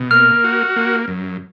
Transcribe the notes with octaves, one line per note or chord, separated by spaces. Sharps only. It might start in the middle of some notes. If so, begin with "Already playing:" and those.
Already playing: B2
A#3 F6
F#4
A#3
F#2